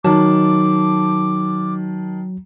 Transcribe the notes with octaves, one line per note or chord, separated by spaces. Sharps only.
D#3 F#3 A5 D6